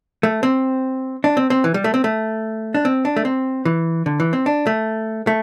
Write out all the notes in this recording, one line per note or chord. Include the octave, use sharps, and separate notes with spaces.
A3
C4
D4
C4
C4
E3
G3
A3
C4
A3
D4
C4
D4
A3
C4
E3
D3
E3
C4
D4
A3
A3